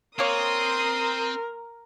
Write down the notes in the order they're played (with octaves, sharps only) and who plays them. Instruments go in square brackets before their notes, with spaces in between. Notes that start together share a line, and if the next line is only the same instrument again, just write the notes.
[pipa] A#3 C#5 [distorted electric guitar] C4 [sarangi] A#4 [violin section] C6 D#6